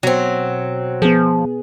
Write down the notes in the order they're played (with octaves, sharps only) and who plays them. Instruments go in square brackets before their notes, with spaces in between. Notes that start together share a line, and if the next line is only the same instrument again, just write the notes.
[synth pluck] B2 [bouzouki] F#3 C4
[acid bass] F3 [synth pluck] B3 G#4